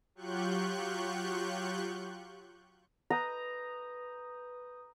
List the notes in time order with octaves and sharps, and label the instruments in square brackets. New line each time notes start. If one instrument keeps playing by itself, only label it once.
[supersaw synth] F#3 F4 G4 C#6 F#6 G6
[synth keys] B4 D#6 G6 [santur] A#5